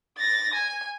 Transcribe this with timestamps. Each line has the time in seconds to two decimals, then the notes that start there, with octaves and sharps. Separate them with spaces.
0.18 A6 A#6
0.53 G#5